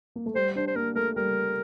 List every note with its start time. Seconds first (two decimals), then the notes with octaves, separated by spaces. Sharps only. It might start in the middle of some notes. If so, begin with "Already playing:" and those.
0.16 A#3
0.26 A3
0.35 G3 C5
0.55 D4 C5
0.67 C5
0.76 A#3 A#4
0.95 A3 A#4
1.16 G3 A#4